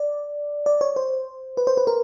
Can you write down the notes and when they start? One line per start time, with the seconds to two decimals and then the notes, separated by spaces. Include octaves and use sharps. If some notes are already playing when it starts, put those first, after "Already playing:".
Already playing: D5
0.66 D5
0.81 C#5
0.96 C5
1.57 B4
1.67 C5
1.77 B4
1.87 A#4